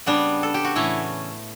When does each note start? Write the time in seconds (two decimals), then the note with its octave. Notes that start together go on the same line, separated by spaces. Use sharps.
0.06 C#3 G3 B3 D4
0.43 A4
0.54 G4
0.65 F#4
0.75 A2 E3 A3 C#4 E4